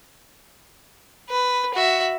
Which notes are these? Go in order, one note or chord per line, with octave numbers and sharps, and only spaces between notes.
B4
F#4 E5